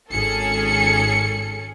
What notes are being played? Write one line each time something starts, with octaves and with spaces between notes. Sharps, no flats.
G#1 C#4 G#4 A4 C#7